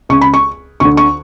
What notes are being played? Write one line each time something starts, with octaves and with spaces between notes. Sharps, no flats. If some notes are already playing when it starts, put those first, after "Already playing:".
C#2 C#3 C#6
B5
C#6
D2 D3 C#6
C#6